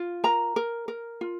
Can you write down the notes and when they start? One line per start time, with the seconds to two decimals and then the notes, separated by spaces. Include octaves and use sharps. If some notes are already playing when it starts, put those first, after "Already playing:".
Already playing: F4
0.24 A#4 A#5
0.56 A#4
0.88 A#4
1.21 F4